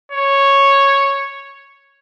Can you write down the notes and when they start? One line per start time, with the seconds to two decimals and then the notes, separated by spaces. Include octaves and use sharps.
0.12 C#5